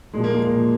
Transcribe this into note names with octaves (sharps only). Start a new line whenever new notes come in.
A#2 F3 G#3
A#3
G#3
A#3
A#2 F3